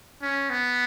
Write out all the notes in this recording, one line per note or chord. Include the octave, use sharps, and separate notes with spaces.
C#4
B3